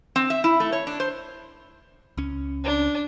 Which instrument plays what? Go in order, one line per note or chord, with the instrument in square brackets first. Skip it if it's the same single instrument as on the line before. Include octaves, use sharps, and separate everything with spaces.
[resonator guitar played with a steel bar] C4
E5
E4
A3
C#5
D4
C5
[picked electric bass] C#2 C#4
[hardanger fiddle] D4